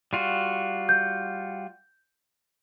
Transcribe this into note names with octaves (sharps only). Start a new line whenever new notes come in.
G3 F4 F#4
G6